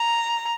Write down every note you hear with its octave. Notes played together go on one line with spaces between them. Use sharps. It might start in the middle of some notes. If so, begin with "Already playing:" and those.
Already playing: A#5